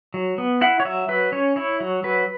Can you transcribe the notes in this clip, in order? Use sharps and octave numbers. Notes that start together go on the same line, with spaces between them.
F#3
B3
E4 F#5
C#5
F#3 E5
F#3 B4
C#4 C#5
E4 C#5
F#3
F#3 B4